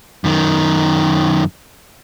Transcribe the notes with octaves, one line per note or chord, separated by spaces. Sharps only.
F#2 D#3